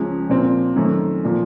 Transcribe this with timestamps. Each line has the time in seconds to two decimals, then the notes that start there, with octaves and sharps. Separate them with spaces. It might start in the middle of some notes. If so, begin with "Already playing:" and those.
Already playing: C#2 C#3 F3
0.30 A#2 F3 C4 F4
0.76 F#2 D#3 A3 C4
1.24 A#2 F3